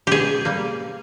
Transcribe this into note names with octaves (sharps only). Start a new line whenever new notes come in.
B2 G4 G#4
G3 A#3